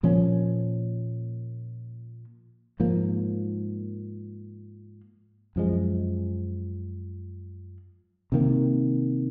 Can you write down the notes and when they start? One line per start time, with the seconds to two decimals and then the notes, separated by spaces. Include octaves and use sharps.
0.03 A#2 F3 A#3 C#4
2.80 G#2 F3 A#3
5.56 F#2 F3 G#3
8.32 C3 D#3 A#3